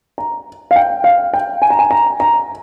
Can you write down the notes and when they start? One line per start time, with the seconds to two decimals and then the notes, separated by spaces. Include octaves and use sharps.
0.18 A#5
0.71 F5
0.76 G5
1.04 F5
1.34 G5
1.62 G#5
1.70 A#5
1.79 G#5
1.91 A#5
2.20 A#5